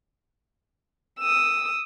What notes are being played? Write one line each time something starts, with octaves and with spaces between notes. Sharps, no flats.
D#6 E6